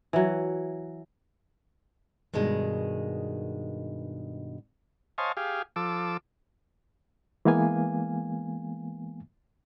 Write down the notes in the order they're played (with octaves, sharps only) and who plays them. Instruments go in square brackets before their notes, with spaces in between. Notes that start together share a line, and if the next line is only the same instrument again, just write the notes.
[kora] E3 F#3
[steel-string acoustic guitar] G2 B2 D#3 G#3
[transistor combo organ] C5 C#5 D#5 F5 G#5 A5
G4 G#4 F5
F3 A4 D6 E6
[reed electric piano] E3 G#3 A#3 B3 F5 G#5